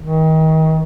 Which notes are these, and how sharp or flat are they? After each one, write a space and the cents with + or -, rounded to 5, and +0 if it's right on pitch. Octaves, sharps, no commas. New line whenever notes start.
D#3 +30